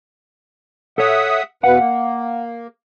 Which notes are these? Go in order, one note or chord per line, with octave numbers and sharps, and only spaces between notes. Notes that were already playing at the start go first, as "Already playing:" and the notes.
A4 C#5 E5 F#5 D#6
E2 B2 B4 F5 F#5
A#3